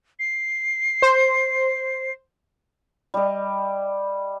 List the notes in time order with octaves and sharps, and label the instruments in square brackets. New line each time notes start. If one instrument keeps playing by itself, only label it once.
[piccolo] C7
[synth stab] C5
[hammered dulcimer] G3 D#5